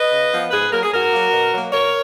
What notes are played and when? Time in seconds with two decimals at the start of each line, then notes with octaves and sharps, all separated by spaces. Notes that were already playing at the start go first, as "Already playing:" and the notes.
Already playing: B4 D#5
0.12 C#3
0.32 F3 B3
0.51 G#2 G#4 B4
0.72 F#3 A#3 A#4
0.83 G#4
0.92 G#2 F#4 A#4
1.12 F#3 A#3
1.33 B2
1.53 F#3 A#3
1.73 B2 A#4 C#5